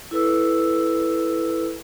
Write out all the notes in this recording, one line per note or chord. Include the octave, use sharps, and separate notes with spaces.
E4 A4 B4 E6